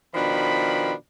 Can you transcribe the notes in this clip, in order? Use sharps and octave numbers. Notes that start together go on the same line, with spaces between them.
B2 D#3 F3 D4 B5